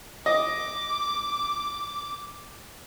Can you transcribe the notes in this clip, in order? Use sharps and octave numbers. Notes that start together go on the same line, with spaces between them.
D#5 D6